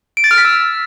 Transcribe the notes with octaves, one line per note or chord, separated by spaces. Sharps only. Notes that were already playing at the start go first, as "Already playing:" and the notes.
D7
A6
F6
B6
E6